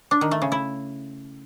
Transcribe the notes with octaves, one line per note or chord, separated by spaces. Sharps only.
D4
D#3
A3
C#3
E4